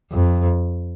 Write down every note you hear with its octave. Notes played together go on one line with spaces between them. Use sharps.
F2